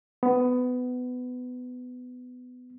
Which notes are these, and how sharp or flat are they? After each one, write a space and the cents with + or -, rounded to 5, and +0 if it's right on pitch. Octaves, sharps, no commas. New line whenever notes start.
B3 +20